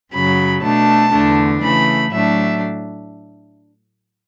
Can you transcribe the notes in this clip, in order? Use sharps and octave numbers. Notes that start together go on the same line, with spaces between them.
F#2 C#3 F#3 B5
B2 A3 D4 A5
E2 D3 A3 D4
C#3 E3 A3 B5
A2 F#3 A3 D4 E5